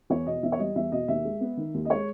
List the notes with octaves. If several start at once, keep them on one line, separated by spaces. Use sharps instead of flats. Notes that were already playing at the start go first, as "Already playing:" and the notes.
E2 C#5
B2 D#5
E2 E5
C#5
G3 D#5
E2 E5
B2 D#5
D#2 E5
G#3
B3
D#3
D#2
D#5
G#3 C#5